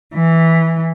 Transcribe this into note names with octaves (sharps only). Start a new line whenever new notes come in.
E3